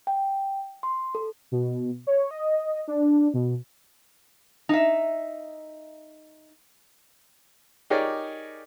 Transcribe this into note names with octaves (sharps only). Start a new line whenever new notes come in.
G5
C6
A4
B2
C#5
D#5
D4
B2
D#4 E5
D#4 G4 G#4 A#4 C#5 D5